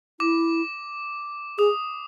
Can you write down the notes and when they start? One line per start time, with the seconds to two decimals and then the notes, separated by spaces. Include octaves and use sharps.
0.20 E4 D6
1.59 G#4 D#6